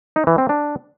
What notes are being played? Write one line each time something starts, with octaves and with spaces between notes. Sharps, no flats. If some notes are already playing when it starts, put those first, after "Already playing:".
D#4
E3
C4
D4